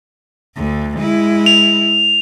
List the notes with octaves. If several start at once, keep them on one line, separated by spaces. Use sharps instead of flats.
D2 D3
G#3 E4
F7